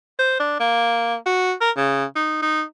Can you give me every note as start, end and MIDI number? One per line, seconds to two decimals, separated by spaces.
0.19 0.39 72
0.40 0.58 62
0.60 1.16 58
1.26 1.53 66
1.61 1.71 70
1.77 2.05 49
2.16 2.37 63
2.42 2.64 63